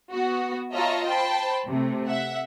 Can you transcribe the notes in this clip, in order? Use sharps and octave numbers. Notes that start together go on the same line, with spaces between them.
B3 F#4
F4 C#5 D#5 E5 A5 A#5
C5 G5 A5 B5
C3 A3
E5 F#5